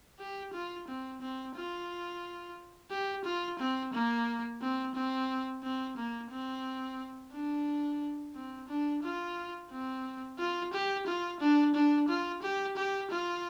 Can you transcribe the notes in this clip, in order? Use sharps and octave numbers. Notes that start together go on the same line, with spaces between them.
G4
F4
C4
C4
F4
G4
F4
C4
A#3
C4
C4
C4
A#3
C4
D4
C4
D4
F4
C4
F4
G4
F4
D4
D4
F4
G4
G4
F4